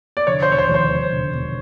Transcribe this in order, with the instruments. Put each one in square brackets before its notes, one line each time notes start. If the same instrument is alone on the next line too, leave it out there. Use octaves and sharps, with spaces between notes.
[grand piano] D5
[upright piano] D3 [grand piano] C#5
[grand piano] C5
[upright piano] E1 [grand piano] C#5
[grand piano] C5
[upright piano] D#2
[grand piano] C5
[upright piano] E1
D3
E1